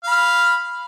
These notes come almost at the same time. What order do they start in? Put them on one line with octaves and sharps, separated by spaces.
F5 B5 F6